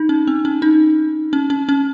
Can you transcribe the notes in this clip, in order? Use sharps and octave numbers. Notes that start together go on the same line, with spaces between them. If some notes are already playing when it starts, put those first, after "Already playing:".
Already playing: D#4
C#4
C4
C#4
D#4
C#4
C#4
C#4